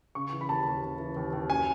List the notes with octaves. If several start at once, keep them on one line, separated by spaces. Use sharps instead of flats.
C#3 C#6
E3
B5
D#2 A5
D#2
C#3
E3
D#2
D#2
F#2 G#5